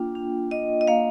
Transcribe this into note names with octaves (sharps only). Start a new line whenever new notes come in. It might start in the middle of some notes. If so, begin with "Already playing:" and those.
Already playing: A#3 D4 F4 G5
D4
D4 D#5
D#5
A#3 F5